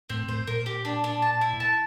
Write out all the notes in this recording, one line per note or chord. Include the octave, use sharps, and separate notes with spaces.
A2 C4
A2 C5
A#2 A#4
G4
D4
D4
A5
E4
A5